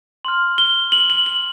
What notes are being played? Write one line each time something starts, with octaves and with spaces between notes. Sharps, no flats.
C6 F6 F#7
G7
F#7
F#7
F#7